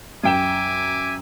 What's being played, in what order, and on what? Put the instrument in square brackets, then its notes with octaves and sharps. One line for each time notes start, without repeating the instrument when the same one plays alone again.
[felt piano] F#2 G5 E7 [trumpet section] E5 G#5 D6